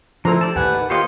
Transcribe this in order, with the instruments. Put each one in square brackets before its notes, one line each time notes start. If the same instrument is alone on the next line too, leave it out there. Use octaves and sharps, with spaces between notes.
[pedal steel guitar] F3 E4 [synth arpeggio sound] A3 C4 D4 [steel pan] A4 C5 A#5
[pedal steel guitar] G4 D5 A5
[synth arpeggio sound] D#2 A2 [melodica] B4 F#5 [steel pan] G#5
[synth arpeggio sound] D#3
[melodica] A#3 F4 G4 [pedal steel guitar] C5 C#5 D#5